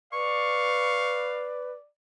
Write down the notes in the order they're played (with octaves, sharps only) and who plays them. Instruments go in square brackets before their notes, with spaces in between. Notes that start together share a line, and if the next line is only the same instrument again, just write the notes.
[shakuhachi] B4 [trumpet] D5 [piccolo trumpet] F5 [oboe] C#6